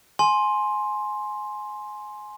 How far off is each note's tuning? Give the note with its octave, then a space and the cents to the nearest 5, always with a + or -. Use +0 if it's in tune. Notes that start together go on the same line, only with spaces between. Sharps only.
G#5 +15 C6 +10